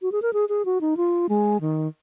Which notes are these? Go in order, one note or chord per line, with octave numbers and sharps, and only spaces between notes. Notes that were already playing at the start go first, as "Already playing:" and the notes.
F#4
G#4
A#4
G#4
G#4
F#4
D#4
F4
G#3
D#3